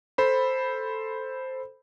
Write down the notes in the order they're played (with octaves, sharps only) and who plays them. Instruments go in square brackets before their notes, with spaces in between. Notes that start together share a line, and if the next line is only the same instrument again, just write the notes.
[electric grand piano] A4 C5 B5